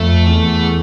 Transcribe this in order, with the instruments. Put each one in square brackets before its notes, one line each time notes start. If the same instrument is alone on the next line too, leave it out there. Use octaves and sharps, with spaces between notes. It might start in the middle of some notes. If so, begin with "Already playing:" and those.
Already playing: [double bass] F2 [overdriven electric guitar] A3
[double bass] E2